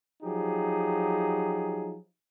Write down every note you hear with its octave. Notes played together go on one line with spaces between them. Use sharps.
F3 F#3 D#4 G4 G#4